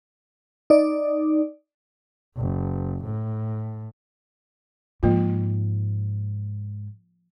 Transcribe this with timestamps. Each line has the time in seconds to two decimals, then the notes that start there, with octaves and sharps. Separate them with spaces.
0.70 D#4 D5
2.37 F#1
3.04 A2
5.03 G#2 F3 A#3 F4